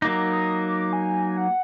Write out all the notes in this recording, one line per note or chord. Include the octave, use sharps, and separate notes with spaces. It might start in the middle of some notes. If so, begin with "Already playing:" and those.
F#3 A#3 D#4 D6
D#6
D6
G#5
F#5